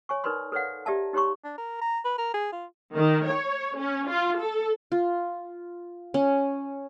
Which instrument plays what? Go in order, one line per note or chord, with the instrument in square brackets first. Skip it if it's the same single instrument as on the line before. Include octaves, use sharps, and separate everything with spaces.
[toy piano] C#5 G#5 C#6
D#4 A#4 B4 D5 B5 C6
A4 B4 C#5 D5 F5 F#5
G4 D5 E5 A5 A#5
D#4 G4 C#5 A#5 C6 C#6
[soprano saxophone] D4
A#4
A#5
B4
A#4
G#4
F4
[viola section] D#3
C#5
C#4
F4
A4
[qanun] F4
C#4